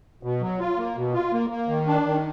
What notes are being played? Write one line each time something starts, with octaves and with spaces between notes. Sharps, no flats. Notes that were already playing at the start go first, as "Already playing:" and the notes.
B2
F#3
F4
A#3
B2
F4
A#3
A#3
D#3
D4
D#3